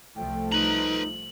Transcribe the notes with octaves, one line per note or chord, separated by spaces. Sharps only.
C2 F3 A3 G5
D#4 B4 A#5 F#7